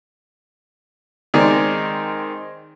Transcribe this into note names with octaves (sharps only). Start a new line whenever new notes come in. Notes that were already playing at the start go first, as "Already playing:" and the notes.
D#3 G#3 C4 G#4 D5